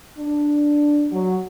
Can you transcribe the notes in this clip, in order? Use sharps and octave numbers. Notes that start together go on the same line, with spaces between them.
D4
F#3